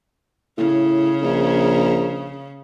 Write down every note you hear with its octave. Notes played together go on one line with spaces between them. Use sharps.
A2 C#3
A#1